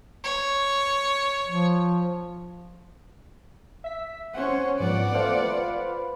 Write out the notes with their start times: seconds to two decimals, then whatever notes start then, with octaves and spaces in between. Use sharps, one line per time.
0.24 C#5
1.47 F3
3.84 E5 B6
4.34 C#4 C5 C#5 F#5
4.80 G#2 F3 B3 D5 F#5
5.14 A3 F4 C5 F5
5.43 B4